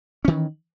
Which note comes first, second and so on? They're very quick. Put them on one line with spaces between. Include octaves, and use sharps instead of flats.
C#4 D#3 E3